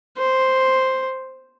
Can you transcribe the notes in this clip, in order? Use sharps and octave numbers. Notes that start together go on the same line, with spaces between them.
C5